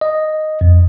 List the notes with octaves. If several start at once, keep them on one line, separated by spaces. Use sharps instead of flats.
D#5
F2